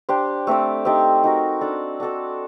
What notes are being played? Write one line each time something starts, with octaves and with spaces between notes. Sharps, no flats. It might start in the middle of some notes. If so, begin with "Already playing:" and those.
D4 G4 C5
A3 C4 G4 D5
C4 D#4 G4 D5
D#4 F#4 A#4
D4 A4 D5
D4 F#4 A4 D5